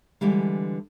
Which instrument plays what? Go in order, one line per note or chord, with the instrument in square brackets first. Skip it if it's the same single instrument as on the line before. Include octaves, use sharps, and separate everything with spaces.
[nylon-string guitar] D3 E3 G3 G#3